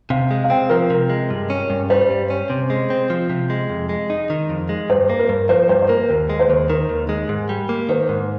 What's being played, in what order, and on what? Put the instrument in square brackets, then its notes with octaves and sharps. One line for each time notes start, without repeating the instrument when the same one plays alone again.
[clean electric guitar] C3 [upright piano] F5
[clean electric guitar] G#3
[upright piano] F5
[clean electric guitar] C4 [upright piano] G5
[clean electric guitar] F3 [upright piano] A#4
[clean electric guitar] C3
G#3
G2
C#4
G2
[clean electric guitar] G3 [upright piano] C5
[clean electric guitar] G2
C#4
C3
G#3
C4
F3
C3
G#3
F2
G#3
D#4
D#3
F2
G#3
[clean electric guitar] G2 [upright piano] C5
[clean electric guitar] A#3
[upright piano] A#4
[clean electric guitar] G2
[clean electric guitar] F3 [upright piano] C5
[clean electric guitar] G2 [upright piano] C5
[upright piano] C5
[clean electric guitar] A#3 [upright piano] A#4
[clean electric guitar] D#2
G#3
[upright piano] C5
[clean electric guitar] D#2
[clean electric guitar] D#3 [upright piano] A#4
[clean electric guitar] D#2
G#3
G#2
G3
A#3
[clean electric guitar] D#3 [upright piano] C5
[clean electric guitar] G#2